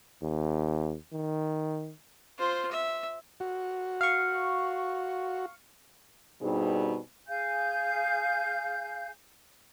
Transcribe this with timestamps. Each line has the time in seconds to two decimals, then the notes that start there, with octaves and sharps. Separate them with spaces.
0.22 D#2
1.12 D#3
2.38 F4 C5
2.72 E5
3.40 F#4
4.01 F5 C#6
6.41 G2 B2 G3 C4 D#4 G#4
7.28 G#4 F5 G#5 G6